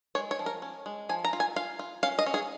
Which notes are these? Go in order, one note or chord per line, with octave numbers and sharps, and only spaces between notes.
G#3 C#5
C#5
F3
A#4
C#4
G#3
F3 G#5
A#5
F4
G#5
F4 F5
F4
C#4 F5
D#5
C#4
G#4